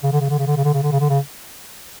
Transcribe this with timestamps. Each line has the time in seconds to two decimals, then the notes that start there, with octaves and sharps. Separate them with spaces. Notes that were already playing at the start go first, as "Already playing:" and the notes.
0.03 C#3
0.12 D3
0.20 C#3
0.29 D3
0.39 C#3
0.47 D3
0.56 C#3
0.64 D3
0.73 C#3
0.83 D3
0.92 C#3
1.00 D3
1.09 C#3